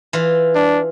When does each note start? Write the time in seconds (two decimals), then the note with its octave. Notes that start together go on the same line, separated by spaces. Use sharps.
0.13 E3 F4
0.55 D4